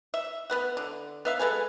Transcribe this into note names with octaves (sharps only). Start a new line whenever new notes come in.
E5
B3 B4 F#5
D3
B3 E5 F5
G#3 A4 B4 G#5